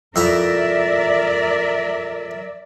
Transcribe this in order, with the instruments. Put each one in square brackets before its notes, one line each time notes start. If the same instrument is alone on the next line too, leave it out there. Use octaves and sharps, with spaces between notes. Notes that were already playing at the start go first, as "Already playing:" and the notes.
[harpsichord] F2 E4 A#5 [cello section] A#4 D5 E5